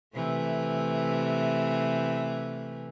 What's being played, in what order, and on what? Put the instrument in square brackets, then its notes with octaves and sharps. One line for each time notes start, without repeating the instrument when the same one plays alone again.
[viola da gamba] C3 E3 A3